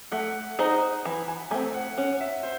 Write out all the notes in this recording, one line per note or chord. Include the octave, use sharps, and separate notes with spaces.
A3 F#5
D#4 G#4 C5 D#5
E3
G#5
A3 C4 G#5
F#5
C#4 F#5
E5
C5